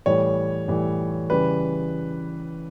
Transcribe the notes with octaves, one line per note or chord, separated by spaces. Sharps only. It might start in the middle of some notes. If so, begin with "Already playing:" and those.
A2 E3 G3 C#5
A2 E3 G3
C#3 E3 G3 B4